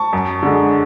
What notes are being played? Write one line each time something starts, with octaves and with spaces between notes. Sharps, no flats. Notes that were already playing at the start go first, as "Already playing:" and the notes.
Already playing: A5 C#6
F#2
D3 G#3